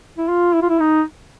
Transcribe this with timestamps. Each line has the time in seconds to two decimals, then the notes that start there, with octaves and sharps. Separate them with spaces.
0.18 E4
0.29 F4
0.54 E4
0.62 F4
0.69 E4
0.80 D#4